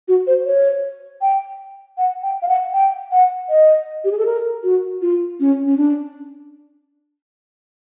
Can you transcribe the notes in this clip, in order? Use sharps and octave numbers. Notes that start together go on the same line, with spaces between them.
F#4
C5
C#5
G5
F#5
G5
F5
F#5
G5
F#5
D#5
G4
G#4
A4
A#4
F#4
F4
C#4
C#4
D4